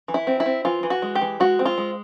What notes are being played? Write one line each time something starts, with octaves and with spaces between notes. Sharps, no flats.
E3
E4
C4
E4
C4
E3 F4
E3
F#4
G#3
G4
E3
G#3 F#4
C4
F4
G#3